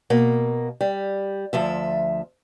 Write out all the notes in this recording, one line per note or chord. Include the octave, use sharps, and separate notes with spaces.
B2 A#3
G3
D2 F3 E5